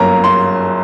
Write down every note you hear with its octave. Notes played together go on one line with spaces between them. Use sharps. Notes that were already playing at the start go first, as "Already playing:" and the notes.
Already playing: G1 F#2 F#3 A#3 A#5
C6